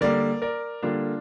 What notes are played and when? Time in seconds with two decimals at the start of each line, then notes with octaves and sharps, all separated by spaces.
0.01 D3 G3 A#3 A#4 D5
0.42 A#4 D5
0.82 D3 G3 A#3 D4 F4